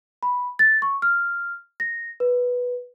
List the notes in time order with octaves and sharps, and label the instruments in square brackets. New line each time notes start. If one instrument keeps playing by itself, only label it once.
[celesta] B5
A6
C#6
F6
A#6
B4